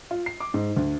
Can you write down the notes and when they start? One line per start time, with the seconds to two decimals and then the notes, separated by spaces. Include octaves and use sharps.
0.11 F4
0.26 C7
0.40 D6
0.54 G#2
0.77 D2